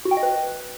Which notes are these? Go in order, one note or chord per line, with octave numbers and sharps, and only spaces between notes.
F#4
G5
D#5
B4